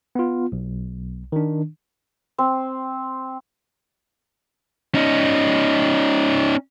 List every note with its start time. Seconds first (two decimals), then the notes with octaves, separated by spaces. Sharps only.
0.15 B3 F4
0.52 B1
1.32 D#3 D4
2.38 C4
4.95 C#4 D#4